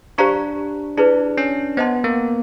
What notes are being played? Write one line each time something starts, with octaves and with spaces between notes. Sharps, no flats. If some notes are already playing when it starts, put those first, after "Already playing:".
D4 G4 C5 F5 A#5 C#6
D4 E4 G#4 B4
C#4
B3 C5 D#5 F#5 A5 C6
A#3